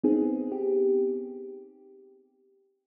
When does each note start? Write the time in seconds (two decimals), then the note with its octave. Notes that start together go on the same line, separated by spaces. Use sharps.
0.03 B3 C4 D#4 G#4
0.52 G4